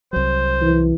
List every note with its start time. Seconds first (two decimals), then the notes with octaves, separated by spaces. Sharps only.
0.13 C2 F#3 C5
0.62 E3